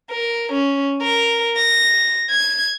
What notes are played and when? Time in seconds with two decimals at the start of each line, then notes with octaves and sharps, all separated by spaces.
0.10 A#4
0.52 C#4
1.02 A#4
1.57 A#6
2.30 G#6